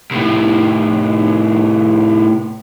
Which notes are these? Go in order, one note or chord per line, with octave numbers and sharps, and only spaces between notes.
C2 A2